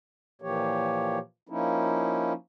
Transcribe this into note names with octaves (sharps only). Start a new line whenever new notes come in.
A#2 E3 F3 A#3 G4 C#5
F3 A#3 C#4 D#4 E4